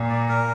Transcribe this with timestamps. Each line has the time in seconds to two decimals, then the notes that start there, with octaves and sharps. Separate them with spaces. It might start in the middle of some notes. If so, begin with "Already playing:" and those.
Already playing: A#2
0.10 D5
0.29 A#4